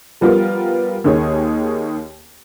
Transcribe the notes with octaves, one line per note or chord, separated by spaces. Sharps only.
F3 G3 B3 F4 A#4
D#2 D#3 G#4 C#5